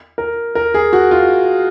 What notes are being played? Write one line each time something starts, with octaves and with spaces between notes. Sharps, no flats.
A#4
A#4
G#4
F#4
F4